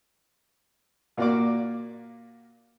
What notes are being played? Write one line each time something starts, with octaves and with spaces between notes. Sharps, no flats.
A#2 A#3 F#4 D5 F5 D6